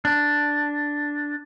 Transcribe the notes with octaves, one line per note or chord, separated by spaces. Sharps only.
D4